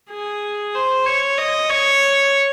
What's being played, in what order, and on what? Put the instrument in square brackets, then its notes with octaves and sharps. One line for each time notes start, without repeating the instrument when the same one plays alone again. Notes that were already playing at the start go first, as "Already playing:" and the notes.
[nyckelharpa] G#4
C5
C#5
D#5
C#5